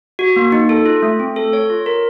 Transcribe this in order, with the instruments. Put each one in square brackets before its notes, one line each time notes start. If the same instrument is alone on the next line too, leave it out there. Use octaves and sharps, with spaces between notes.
[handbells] F#4
A#3
D#4
A4
F4
A3
C4
A4
C#5
F4
A#4